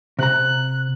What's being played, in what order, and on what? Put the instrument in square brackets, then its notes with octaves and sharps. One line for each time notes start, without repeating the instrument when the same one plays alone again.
[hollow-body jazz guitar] C3 A#5 [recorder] F#6